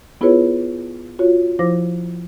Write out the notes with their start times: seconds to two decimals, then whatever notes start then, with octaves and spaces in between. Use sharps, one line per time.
0.21 B3 E4 F4 G#4 B4 C#5
1.19 F4 F#4 C#5
1.59 F3 E4 C5 D6 A#6